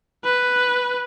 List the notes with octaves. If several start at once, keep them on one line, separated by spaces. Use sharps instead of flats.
B4